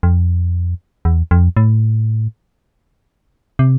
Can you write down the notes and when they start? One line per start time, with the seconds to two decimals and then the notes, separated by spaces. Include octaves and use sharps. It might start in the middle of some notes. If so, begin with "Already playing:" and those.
0.03 F2
1.05 E2
1.31 F2
1.57 A2
3.59 C3